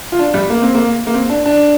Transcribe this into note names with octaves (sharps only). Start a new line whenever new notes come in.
F4
D4
G3
A#3
C4
A#3
A#3
C4
D4
D4